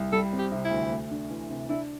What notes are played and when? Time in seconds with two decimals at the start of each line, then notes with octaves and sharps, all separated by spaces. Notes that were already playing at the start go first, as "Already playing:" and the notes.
Already playing: C2
0.12 G3 A4
0.33 C4
0.39 G4
0.52 C3
0.65 E4
0.71 D2
0.91 A3
1.11 D4
1.31 E3
1.50 C3
1.69 D4 E4